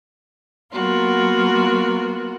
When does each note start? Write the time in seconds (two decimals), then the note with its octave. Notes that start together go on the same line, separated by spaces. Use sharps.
0.73 F#3 A#3 B3 F4 F#4 A#4